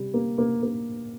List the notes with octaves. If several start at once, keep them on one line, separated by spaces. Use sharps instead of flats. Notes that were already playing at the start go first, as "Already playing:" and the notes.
Already playing: C3 G3
A#3
A#3
A#3